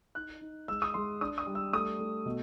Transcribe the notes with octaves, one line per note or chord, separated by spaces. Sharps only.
D#4 F#6
D#4
G#3 E6
D#6
G#3 C6
D4 D#6
D#6
G3
E6
A3 D#6
A3
B2